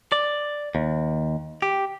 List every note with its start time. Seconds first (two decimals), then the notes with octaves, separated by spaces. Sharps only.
0.12 D5
0.75 D#2
1.62 G4